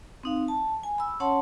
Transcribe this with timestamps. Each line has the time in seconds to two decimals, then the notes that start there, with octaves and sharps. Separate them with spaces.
0.23 C4 D#4 F5
0.48 A5
0.83 G#5
0.98 B5 E6
1.20 C#4 C#5 F#5 A5 C6